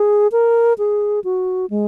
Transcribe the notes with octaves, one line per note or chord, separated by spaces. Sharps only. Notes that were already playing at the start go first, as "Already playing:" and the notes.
Already playing: G#4
A#4
G#4
F#4
G#3